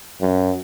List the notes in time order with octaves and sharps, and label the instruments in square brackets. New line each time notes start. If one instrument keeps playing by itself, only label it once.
[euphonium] F#2